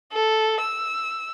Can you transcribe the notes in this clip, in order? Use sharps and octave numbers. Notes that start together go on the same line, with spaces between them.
A4
E6